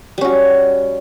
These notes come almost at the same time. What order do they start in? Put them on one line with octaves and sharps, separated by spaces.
G3 C#4 F#4